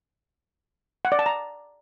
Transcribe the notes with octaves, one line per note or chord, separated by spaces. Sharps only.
F#5
D5
A5
A#5